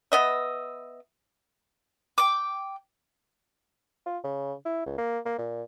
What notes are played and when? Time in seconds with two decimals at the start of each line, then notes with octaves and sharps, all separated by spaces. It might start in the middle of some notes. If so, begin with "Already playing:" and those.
0.12 B3 D#5 E5
2.18 G5 D6
4.06 F4
4.24 C#3
4.65 E4
4.86 C#2
4.98 A#3
5.25 A#3
5.38 A#2